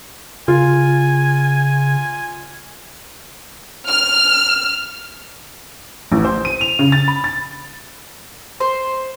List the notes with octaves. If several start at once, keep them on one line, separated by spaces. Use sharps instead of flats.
C#3 F4 G#5
F6
A1
C5
D#7
F7
C#3
A6
B5
A6
C5